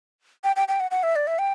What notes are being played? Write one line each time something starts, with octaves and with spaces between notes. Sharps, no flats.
G5
G5
G5
F#5
F#5
E5
D5
E5
G5